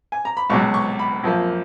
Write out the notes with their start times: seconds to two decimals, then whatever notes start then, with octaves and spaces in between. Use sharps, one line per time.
0.12 G#5
0.25 A#5
0.37 B5
0.50 C#2 B2 F#3 C#6
0.74 C#6
0.99 B5
1.24 F#2 F3 A#3